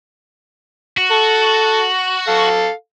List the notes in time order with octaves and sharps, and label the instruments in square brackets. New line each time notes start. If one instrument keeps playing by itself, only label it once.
[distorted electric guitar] F#4
[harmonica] A4
A4 F5